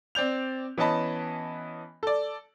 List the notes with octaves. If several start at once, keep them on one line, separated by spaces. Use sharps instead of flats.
C4 D5 G6 F7
E3 B3 C#4 D#5 A5 B5
A4 D5